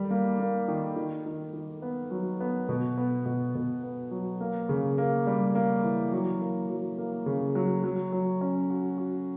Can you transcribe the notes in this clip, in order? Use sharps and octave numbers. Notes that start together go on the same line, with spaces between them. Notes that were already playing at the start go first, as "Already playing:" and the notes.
Already playing: D#3 G3
A#3
A#3
D#3
D#3
D#3
D#3
B3
F#3
B3
B2
B3
B2
B2
B3
F#3
A#3
C#3
A#3
G3
A#3
E3
F#3
A#3
F#3
A#3
C#3
F#3
F#3
F#3
C#4
F#4
F#4